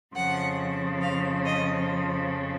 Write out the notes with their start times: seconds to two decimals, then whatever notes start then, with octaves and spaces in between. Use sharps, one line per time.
0.15 F2 C#3 F3 F#5
1.01 F5
1.45 D#5